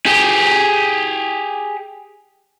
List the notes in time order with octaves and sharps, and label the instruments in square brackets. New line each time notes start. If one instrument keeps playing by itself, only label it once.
[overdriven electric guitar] G4 G#4